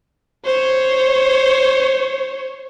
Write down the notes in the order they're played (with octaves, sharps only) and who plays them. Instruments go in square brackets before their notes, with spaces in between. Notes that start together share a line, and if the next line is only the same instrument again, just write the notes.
[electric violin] C5 C#5